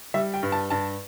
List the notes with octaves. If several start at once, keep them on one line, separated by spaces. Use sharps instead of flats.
G3 E5
G5
G2
A5
G2 A5